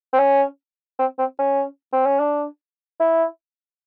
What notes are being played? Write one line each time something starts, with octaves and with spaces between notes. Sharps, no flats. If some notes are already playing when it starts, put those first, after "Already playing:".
C4
C#4
C4
C4
C#4
C4
C#4
D4
E4